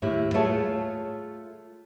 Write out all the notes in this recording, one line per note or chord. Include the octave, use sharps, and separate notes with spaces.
D#2 A2 E4 G4
A3 F4 G#4 C#5 F5 A5